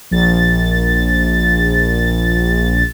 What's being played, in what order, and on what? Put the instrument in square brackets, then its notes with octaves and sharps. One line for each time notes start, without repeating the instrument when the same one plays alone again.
[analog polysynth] A#1 A6